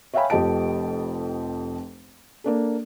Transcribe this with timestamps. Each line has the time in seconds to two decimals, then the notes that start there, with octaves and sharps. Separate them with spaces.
0.14 C#5 E5 F5 G5 G#5 B5
0.30 F1 F2 G4 D#5 A5 D7
2.44 A#3 D4 A4